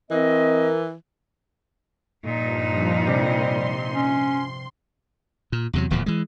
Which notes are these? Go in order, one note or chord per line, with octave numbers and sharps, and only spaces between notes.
E3 C4 A#4 D#5
G2 A#2 F3 D#4
C3 G3 C6
C#4
A#2
E2 C3 F#3
D1 E2 A#2 F3
E3 G#3